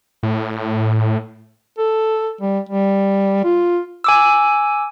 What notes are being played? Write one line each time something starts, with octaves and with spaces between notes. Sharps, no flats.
A2
A4
G3
G3
F4
G#5 D6 E6